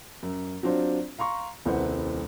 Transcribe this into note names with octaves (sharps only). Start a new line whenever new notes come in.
F#2
F#3 C4 D4 F4 C5
F5 A#5 C6 C#6
D#1 C2 E4 B4 C5 F#5